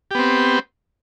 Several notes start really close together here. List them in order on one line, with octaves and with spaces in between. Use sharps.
G4 B3 C4